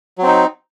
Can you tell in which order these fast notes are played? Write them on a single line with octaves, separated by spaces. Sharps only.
F#3 C4 D#4